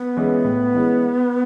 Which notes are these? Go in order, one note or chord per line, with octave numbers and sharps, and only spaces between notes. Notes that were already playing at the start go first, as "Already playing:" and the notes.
Already playing: B3
E3 G#3 C#4 E4
A2
E3 G#3 C#4 E4